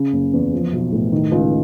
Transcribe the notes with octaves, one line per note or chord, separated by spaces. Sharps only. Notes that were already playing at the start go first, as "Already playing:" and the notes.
Already playing: C#3
F#1
E2
F3
B1
A2
D#3
C#2